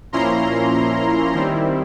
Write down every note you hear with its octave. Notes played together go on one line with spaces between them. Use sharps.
A#2 F3 A#3 C#4 E4 A#5 C6
D#3 G3 C4 E4